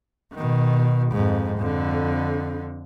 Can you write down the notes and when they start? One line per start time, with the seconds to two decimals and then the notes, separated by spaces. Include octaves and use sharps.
0.34 B2 D#3
1.12 F2 G#2
1.59 F2 D3